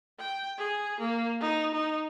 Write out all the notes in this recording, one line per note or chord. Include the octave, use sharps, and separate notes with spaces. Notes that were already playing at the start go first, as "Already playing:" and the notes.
G5
G#4
A#3
D#4
D#4